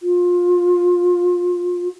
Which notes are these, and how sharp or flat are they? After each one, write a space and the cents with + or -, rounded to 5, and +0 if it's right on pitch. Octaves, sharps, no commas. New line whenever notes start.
F4 +25